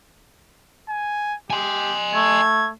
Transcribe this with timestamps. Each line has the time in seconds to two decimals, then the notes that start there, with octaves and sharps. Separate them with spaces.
0.89 G#5
1.50 G4 G#5 C6
2.14 A3 G#6